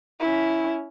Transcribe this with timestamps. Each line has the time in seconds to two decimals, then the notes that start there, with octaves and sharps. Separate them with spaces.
0.20 C#4 E4